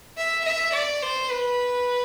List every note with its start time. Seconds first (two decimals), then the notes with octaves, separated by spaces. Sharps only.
0.18 E5
0.46 E5
0.74 D5
1.02 C5
1.30 B4